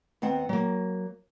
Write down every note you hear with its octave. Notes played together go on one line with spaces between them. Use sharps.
D#2 B3 C4 F#5
F#3 A#3